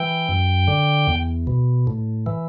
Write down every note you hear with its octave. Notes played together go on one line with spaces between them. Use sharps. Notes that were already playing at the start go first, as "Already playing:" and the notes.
Already playing: E3 G5
F#2
D3
E2
B2
A2
E3